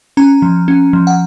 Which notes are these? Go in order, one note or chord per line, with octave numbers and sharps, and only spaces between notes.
C#4 A#5
F3
C#4
F3
F#5